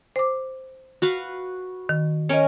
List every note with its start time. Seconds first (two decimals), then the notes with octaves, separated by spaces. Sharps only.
0.16 C5 D6
1.02 F#4 B4 F5
1.89 D#3
2.29 C#4 A#4 C#5 D#5